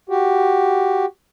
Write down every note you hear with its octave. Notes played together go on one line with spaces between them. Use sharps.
F#4 G4